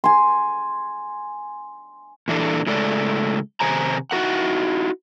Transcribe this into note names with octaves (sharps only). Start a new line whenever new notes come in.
G#5 C6
A#2 E3 D4 A4
A2 C#3 G#3 A4 D5
C3 D#3 C5 G#5 A#5
D#4 E4 F#4 A#4 F#5